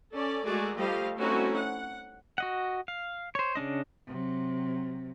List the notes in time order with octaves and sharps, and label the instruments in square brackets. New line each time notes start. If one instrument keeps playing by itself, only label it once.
[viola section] C#4 A4 D5
G#3 A3 F#4 G#4 A#4 D5
F3 G3 A3 G4 D#5 F5
A3 C4 C#4 D#4 E4 F#4
F#5
[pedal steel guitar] F#4 D#5 F#5
F5
C5 C#5
C#3 C#4 D4 D#5
[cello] C3 F#3